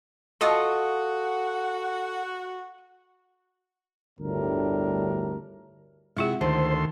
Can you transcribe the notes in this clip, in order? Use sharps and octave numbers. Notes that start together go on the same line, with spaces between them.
F4 F#4 A4 D#5 C#6
G1 D2 A2 G3 D4 A#4
C3 G#3 E4 F4 G#4 F#5
D2 D#3 A4 C5 C6